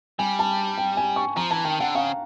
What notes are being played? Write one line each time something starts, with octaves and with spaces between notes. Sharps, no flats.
G3 G#5
A5
G5
G#5
C#6
F3 A#5
E3 A5
D#3 G5
D3 F#5
C#3 F5